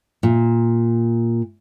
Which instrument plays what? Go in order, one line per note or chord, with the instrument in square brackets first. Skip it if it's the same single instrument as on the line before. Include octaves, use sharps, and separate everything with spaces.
[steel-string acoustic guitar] A#2